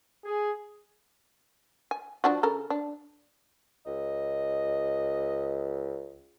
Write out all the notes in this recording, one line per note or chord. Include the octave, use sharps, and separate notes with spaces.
G#4
G#5
F3 D4 F#4
C#3 A4 A#4
D4
C#2 D#5